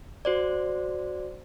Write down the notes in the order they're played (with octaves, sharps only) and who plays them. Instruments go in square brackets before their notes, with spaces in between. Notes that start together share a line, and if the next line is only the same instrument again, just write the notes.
[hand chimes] F#4 C5 D5